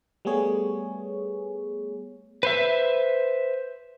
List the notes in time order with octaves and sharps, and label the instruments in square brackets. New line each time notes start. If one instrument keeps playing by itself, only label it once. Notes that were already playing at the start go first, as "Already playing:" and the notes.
[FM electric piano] G3 A3 B3 G#4 C#5
[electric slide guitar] B4 C5 E5